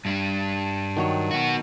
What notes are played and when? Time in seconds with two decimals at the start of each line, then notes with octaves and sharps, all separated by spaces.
0.05 G2 G3
0.97 D#3 F#3 C#5
1.31 B3 F#4